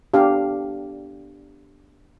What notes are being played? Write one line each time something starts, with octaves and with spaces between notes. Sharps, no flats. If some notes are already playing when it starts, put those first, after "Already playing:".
B3 D4 G4 D5 F5